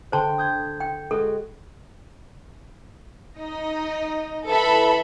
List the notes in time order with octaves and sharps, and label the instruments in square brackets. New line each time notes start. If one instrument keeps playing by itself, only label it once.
[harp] D3 G5 C6 [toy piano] C5 A5
[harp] D#6 G6 G#6
[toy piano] G5
[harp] G#3 F#4 [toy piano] A4
[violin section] D#4 D#5
[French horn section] E3 B4 [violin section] A4 E5 B5